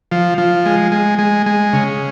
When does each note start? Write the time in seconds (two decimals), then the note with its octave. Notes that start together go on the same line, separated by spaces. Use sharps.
0.12 F3
0.38 F3
0.66 G#3
0.92 G#3
1.19 G#3
1.46 G#3
1.73 C#3